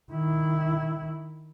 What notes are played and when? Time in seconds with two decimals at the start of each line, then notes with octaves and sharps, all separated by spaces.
0.12 D#3 E4